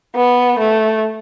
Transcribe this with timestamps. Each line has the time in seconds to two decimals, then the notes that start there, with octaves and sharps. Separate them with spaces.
0.15 B3
0.60 A3